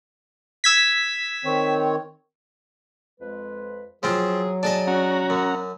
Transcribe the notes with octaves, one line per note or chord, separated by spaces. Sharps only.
E6 G#6 B6
D#3 C4 C#5
F2 G#3 B4
F3 F#3 C4 F4 G#4
D4 G#4 D#5 A5
C#4 F#4 F#5 A#5
F#2